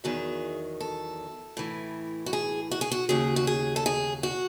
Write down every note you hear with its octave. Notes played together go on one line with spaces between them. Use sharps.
E2 D#3 F#3 G#4
A4
A2 E3
F#4
G#4
F#4
G#4
F#4
D#2 C#3 F#3 G#4
F#4
G#4
A4
G#4
F#4